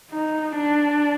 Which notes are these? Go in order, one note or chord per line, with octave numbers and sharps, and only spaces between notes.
D#4
D4